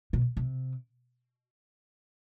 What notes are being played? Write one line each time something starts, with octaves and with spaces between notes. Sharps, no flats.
B2
C3